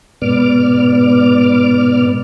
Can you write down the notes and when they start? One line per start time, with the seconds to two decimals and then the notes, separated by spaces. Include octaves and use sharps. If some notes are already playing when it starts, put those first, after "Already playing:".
0.22 G#2 B2 B3 D5 D6 F6